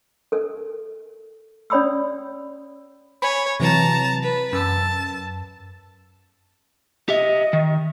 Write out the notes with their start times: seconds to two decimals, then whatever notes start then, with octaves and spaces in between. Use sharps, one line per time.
0.32 A4 A#4
1.70 C#4 C#5 D5 B5 D#6 E6
3.22 C#5 G#5 B5
3.60 C3 E3 F#3 A5 A#5
4.23 B4
4.52 F#2 A5 E6
7.09 G4 D#5 E5
7.53 D#3